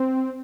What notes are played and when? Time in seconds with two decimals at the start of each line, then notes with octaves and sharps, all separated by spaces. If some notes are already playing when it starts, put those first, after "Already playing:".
Already playing: C4